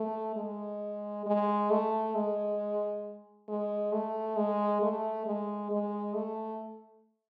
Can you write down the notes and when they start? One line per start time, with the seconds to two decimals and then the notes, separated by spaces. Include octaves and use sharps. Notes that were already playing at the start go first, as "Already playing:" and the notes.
Already playing: A3
0.36 G#3
1.26 G#3
1.70 A3
2.15 G#3
3.48 G#3
3.93 A3
4.37 G#3
4.82 A3
5.26 G#3
5.71 G#3
6.15 A3